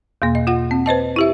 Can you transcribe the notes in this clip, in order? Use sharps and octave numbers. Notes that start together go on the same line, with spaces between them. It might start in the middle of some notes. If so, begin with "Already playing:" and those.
E2 B2 A#3
D#5
F4 F#5
C4
B4 C5 D#5 A5
E4 G4 E5